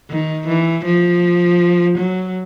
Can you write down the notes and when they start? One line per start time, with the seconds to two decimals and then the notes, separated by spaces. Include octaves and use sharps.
0.10 D#3
0.48 E3
0.85 F3
1.98 F#3